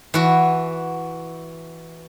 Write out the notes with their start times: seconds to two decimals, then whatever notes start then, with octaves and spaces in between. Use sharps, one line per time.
0.14 E3 F#4